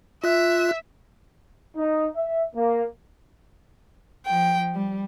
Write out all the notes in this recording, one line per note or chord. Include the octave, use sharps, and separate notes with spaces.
F4 E5 F#6
D#4
E5
A#3
F3 G5
G3